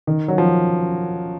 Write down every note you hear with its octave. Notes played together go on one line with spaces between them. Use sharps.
D#3
F#3
F3